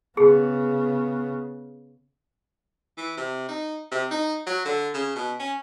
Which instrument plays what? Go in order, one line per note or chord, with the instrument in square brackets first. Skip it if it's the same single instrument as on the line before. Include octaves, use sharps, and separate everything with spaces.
[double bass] C#3 B3 [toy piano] G#4
[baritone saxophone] E3
C3
D#4
C3
D#4
F#3
D3
C#3
B2
C#4